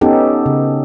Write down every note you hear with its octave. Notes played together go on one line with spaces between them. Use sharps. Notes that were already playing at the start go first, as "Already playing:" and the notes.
B3 C#4 D#4 G4 A4
C#3